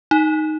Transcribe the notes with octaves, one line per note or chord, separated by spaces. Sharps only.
D#4